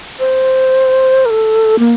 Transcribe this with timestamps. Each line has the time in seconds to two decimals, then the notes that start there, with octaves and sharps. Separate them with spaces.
0.20 C5
1.26 A#4
1.30 A4
1.79 A#3